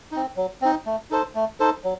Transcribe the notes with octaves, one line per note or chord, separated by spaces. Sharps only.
C4 D#4
F#3
C4 D#4
A3
D#4 A4 C5
A3
D#4 A4 C5
F#3